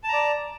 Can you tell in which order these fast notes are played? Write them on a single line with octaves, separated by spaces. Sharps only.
A5 A#5 D5